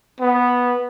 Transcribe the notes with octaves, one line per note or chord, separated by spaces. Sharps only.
B3